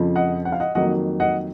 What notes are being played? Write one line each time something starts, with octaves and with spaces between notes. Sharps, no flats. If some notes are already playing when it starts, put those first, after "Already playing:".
Already playing: F2 C#3 F3
D#5 F#5
F#5
F5
D#5 F#5
F2 D#3 F#3 A#3 D#4 D#5 F#5
D#5 F#5